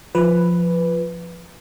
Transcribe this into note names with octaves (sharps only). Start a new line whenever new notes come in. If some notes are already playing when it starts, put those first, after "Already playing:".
F3 B4